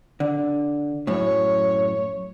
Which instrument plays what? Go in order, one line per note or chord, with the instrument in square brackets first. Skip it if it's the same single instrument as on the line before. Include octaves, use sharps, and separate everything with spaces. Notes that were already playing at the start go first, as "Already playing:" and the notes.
[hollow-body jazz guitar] D3
[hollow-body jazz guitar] F#2 A2 [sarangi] C#5